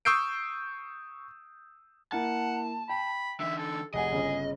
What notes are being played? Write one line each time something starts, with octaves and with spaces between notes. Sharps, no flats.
C#6 D#6 E6 G6 C7 D7
A#3 E4 F#5 A5
G5 B5
D3 E3 E5
A4
F1 G#4 D#5 F#5 G#5
G1 C#3